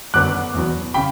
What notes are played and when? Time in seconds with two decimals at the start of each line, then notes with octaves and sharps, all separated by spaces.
0.14 F#2 D3 F#3 B3 D6 F#6
0.54 E2 B2 F#3 B3
0.94 C#3 G5 B5